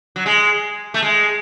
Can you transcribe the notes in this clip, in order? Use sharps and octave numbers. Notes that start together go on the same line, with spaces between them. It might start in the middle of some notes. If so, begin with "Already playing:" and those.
F#3
G#3
A3
G#3